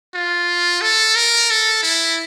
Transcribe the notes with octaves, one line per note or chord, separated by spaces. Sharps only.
F4
A4
A#4
A4
E4